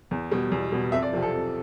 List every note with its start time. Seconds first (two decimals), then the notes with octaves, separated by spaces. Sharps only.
0.11 E2
0.31 B2 G3
0.52 E2
0.72 B2 G3
0.92 F2 E5
1.03 D5
1.13 C3 F3 G4
1.22 A4
1.33 F2